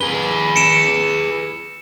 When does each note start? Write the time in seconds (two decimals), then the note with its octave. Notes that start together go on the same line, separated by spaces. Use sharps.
0.01 G#4 B4 G7
0.56 C#7 D7 E7